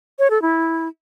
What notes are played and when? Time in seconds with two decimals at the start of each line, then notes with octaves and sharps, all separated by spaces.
0.19 C#5
0.30 A4
0.42 E4